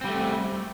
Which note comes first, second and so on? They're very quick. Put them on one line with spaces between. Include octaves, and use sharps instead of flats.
C4 G3 A3